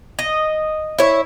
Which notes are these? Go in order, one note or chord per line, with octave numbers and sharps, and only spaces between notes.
D#5
E4 C#5